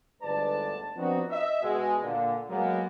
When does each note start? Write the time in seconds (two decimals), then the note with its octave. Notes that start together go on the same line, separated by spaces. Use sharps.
0.23 G1 D2 G#2 B4 D5 A5
0.97 F3 B3 C4 D4 D#4 F#4
1.31 D#5 E5
1.63 B2 G#3
2.03 A#2 D3
2.49 F#3 G#3 A#3 B3